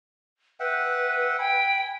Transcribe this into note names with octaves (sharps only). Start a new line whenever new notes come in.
B4 E5 F#5 G5
G5 G#5 B5